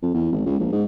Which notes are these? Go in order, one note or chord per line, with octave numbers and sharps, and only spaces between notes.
F2
E2
G#1
C#2
A#1
G#2